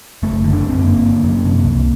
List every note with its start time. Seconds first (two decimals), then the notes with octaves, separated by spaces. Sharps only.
0.23 F#1 A3
0.44 D3
0.53 D4
0.64 F#2 C4
0.84 G1 A#3
1.04 D3
1.24 F#2
1.45 C3
1.65 C2